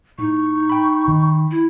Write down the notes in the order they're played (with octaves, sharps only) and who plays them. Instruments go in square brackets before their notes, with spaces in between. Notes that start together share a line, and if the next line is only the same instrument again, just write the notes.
[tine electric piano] A2 [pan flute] D#4 [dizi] C#6
[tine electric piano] G5 B5
[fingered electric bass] D#3
[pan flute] E4